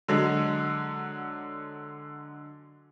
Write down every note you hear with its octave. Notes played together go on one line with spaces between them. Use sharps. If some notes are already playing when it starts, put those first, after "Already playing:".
D3 F#3 G#3